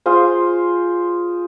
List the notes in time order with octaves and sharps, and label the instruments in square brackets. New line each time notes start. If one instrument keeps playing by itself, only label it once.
[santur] F4 G#4 C5